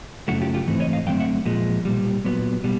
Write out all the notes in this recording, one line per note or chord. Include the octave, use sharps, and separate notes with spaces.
F#2 C#3 F#3 A3 E4 F#4
F4 G4
F4 G4
G#2 E3 A3 C4
C#5 D#5
D#5 F5
F#2 D3 F#3 A3 C4 F5 G5
E5 F#5
A#2 F3 G#3
B1 A#2 G3
A#2 F#3 B3
B2 G3